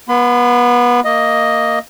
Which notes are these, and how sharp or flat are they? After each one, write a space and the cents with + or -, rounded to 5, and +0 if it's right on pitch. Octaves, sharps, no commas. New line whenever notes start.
B3 -25 B5 +40
A#3 -10 D#5 +0